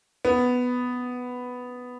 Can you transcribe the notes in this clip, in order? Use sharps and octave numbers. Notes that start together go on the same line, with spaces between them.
B3